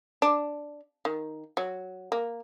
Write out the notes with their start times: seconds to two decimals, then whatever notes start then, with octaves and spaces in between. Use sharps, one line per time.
0.22 D4
1.05 D#3
1.57 F#3
2.12 A#3